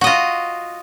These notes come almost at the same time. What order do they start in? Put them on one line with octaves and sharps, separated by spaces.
F#4 D#5 F4